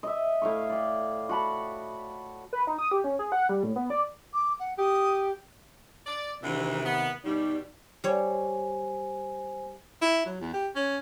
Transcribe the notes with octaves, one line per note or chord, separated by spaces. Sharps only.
D#5 E5
A2 F5 C#6
D5 G5
F#4 F#5 A5 B5
B4
D#4
D#6
G4
C#4
G#4
F#5
G3
A2
B3
D5
D6
F#5
G4 D#6
D5
D2 C3 D#3 E3
B3
B2 G3 D#4 D5
G3 C5 C#5 G#5
E4
F#3
E2
G4
C#4